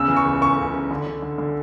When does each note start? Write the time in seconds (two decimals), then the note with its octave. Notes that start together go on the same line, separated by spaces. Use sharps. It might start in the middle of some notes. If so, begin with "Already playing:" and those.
Already playing: E2 C#3 E6
0.08 E3
0.17 C#6
0.25 C#2
0.41 C#2 C#6
0.58 C#2
0.73 C#2
0.91 D3
1.07 D3
1.22 D3
1.38 D3